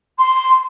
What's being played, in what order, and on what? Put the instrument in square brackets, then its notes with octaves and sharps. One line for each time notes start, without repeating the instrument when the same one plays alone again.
[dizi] C6